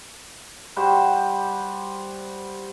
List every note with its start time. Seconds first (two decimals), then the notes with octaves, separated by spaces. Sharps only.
0.76 G3 F#4 G4 C5